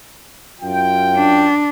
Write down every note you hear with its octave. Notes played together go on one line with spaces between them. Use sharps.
F#2 F4 G5
D4